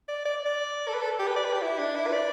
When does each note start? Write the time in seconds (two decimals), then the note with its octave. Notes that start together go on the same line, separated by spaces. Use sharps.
0.08 D5
0.25 D5
0.45 D5
0.88 A4
0.94 B4
1.02 A4
1.19 G4
1.27 B4
1.36 D5
1.45 B4
1.53 G4
1.62 E4
1.79 D4
1.96 E4
2.07 B4
2.13 D5